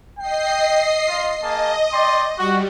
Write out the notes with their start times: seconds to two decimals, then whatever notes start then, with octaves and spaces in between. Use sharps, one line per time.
0.18 D#5 G5 C7
1.08 F4
1.43 A#3 G#4 D#5 A5
1.93 D5 G5 C6
2.39 G3 F#4